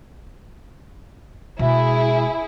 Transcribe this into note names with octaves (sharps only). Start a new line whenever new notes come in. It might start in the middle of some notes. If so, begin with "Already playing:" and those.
B2 G#3 E4 G#4